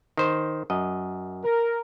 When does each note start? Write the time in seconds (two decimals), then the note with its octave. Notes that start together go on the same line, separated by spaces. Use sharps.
0.17 D#3 C5
0.70 F#2 D#5
1.44 A#4